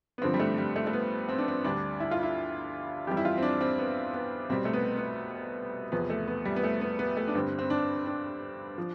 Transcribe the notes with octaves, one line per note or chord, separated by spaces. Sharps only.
B3
G2 D3 F3 C4
G3
A3
G3
A3
A3
B3
C4
D4
C4
D2 D3 G3 D4
E4
F4
E4
F2 E3 G3 G4
E4
F4
C4
D4
C4
B3
B3
C2 B2 G3 C4
A3
B3
B3
E2 C3 F3 B3
A3
B3
G3
B3
A3
B3
B3
A3
D4
G2 D3 G3 C4
C4
D4
D4
F3